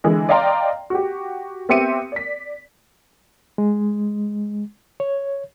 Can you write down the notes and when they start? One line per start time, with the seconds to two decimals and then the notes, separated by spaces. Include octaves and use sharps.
0.04 D3 E3 G#3
0.29 D5 D#5 F5 G5 A#5 C6
0.90 F#4 G4
1.69 B3 C4 G4 E5 C#7 D#7
2.12 D5 B6
3.58 G#3
5.00 C#5